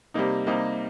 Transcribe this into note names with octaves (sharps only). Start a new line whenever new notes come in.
C3 G3 A#3 D#4
C3 G3 A#3 D#4